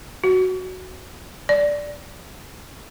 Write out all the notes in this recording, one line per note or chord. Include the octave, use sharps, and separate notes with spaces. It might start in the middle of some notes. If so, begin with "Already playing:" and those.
F#4
D5